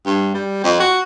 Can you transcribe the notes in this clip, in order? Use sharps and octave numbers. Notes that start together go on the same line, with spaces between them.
G2
G3
F2
F#4